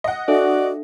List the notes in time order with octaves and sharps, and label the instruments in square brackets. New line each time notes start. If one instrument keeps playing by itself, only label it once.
[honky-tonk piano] D#5 F#5
[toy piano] D4 A4 E5 [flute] F#4 [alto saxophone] D5